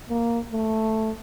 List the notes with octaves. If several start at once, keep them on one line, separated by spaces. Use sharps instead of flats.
A#3
A3